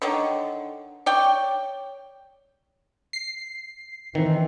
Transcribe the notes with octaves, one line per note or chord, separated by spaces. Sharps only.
D3 D#3 C#5
C#5 D5 G5
C7
D#3 E3 C4